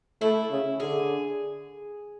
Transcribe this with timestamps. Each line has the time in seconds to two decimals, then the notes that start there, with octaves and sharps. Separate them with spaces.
0.21 A3 E4
0.50 C#3
0.80 D3 G#4